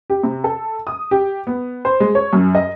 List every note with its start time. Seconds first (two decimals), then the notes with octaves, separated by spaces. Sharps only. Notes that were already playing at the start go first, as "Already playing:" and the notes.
0.10 G4
0.23 C3
0.44 A4
0.87 D#6
1.11 G4
1.47 B3
1.85 C5
2.00 G#3
2.15 C#5
2.33 F#2
2.55 D#5